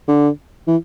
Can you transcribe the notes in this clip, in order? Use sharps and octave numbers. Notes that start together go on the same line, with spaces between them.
D3
E3